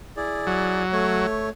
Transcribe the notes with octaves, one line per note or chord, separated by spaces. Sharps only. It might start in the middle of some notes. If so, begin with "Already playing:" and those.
E4 G#4 D5
F#3
A3 C#5